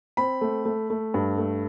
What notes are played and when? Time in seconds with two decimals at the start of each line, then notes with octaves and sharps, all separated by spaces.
0.17 C4 B5
0.41 A3
0.65 A3
0.90 A3
1.14 G2
1.38 A3